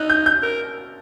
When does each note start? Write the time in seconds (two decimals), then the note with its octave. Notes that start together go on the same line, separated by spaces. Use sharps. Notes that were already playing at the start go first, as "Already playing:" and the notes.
Already playing: D#4 F#6
0.10 G6
0.26 G6
0.43 A#4